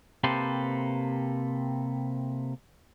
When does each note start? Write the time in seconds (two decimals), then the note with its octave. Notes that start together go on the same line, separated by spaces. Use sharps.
0.24 C3 A#3 G4 A4 B4 C5